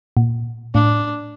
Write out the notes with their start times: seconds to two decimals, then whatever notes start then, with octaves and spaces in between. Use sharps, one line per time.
0.17 A#2
0.74 A2 D4